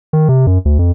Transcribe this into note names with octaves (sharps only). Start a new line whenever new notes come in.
D#3
C3
F#2
D2
F2